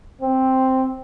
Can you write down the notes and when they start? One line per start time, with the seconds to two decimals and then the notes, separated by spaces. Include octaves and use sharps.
0.21 C4